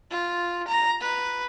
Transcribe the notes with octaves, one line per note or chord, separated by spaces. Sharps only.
F4
A#5
B4